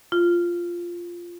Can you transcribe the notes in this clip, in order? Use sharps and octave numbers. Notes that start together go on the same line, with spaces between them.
F4